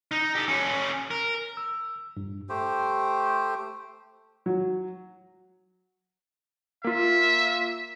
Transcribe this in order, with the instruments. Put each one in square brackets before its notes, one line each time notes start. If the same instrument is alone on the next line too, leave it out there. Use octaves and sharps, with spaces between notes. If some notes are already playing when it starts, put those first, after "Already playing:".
[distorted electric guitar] D#4
G4 A4
C#4 A4
A#4
[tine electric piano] E6
G2
[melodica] A3 G4 C5
[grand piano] F#3
[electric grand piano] A#3 F4 [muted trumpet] E5